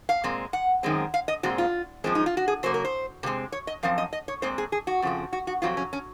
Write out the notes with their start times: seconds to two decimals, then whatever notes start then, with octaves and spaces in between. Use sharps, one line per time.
0.09 F5
0.24 A#2 G#3 C4
0.53 F#5
0.83 F#2 D#3 G#3 C4
1.14 F5
1.28 D#5
1.43 A#2 G#3 C4 F#4
1.58 F4
2.04 F#2 F3 G#3 C4
2.15 D#4
2.26 F4
2.37 F#4
2.48 G#4
2.63 C#3 F#3 A#3 C5
2.74 A#4
2.85 C5
3.23 C3 F3 G#3 C4
3.52 C#5
3.67 D#5
3.83 F#2 F3 C4 F5
3.98 D#5
4.13 D#5
4.28 C#5
4.42 A#2 G#3 C4 C5
4.58 G#4
4.72 G#4
4.87 F#4
5.02 F2 C#3 F3 C4
5.33 F#4
5.47 F#4
5.62 F2 C3 F#3 C4 F4
5.77 C#4
5.93 C#4